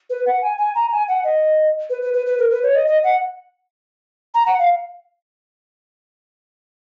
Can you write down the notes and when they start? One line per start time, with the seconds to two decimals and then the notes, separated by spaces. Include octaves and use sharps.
0.10 B4
0.26 F#5
0.42 G#5
0.58 G#5
0.75 A#5
0.92 G#5
1.08 F#5
1.24 D#5
1.90 B4
2.02 B4
2.14 B4
2.27 B4
2.39 A#4
2.51 B4
2.63 C#5
2.75 D#5
2.87 D#5
3.04 F#5
4.34 A#5
4.47 F#5
4.59 F5